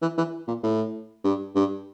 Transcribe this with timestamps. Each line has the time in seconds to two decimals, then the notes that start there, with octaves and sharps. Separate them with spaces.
0.02 E3
0.18 E3
0.48 A#2
0.63 A2
1.24 G2
1.55 G2